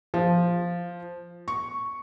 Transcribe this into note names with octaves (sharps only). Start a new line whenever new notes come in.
F3
C#6